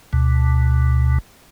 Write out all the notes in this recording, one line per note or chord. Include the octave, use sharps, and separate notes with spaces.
D2 B2